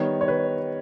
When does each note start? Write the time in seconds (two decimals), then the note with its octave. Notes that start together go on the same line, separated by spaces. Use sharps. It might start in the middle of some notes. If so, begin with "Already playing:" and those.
Already playing: D#3 G3 B3 C#5
0.21 C#5
0.28 B4